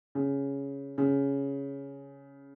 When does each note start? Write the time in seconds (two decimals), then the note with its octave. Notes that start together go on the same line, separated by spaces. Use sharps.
0.15 C#3
0.98 C#3